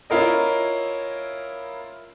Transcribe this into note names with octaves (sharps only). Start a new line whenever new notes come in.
C#4 E4 F4 A#4 D#5